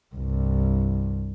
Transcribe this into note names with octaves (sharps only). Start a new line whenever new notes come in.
C2 G2